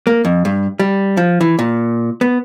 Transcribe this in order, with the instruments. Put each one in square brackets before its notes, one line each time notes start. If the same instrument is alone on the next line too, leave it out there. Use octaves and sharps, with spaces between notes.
[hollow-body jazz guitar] A#3
F2
G2
G3
F3
E3
A#2
B3